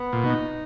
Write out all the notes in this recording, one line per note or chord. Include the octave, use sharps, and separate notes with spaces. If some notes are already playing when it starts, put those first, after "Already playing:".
Already playing: B3
A#2
B2 D#4